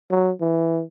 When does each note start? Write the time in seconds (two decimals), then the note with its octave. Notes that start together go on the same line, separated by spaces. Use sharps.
0.11 F#3
0.41 E3